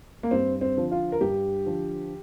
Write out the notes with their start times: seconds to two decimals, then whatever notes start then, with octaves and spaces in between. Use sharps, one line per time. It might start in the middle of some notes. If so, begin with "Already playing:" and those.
0.23 A#3
0.31 G2 C4
0.61 C4
0.77 D3 F3
0.91 F4
1.12 A#4
1.21 G2 G4
1.66 D3 F3